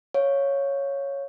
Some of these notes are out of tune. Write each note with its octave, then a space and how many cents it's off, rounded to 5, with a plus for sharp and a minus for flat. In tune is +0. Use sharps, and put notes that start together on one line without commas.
C#5 +0 F5 +0